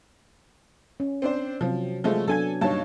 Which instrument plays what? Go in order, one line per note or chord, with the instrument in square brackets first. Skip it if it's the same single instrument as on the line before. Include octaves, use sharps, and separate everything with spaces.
[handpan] C#4
[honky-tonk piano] C4 D4 C5
[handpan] C3 F#3 C4 [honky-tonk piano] F3
[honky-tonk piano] F3 G#3 A3
[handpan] F#3 B3 D4 [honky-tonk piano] A4 G#5 G#6
[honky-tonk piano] G2 A5 [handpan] A#3 D#4 C#5